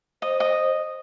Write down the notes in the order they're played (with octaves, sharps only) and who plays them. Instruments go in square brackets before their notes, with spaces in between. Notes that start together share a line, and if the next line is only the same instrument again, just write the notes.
[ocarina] C5 [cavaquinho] D#5
[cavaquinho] D#5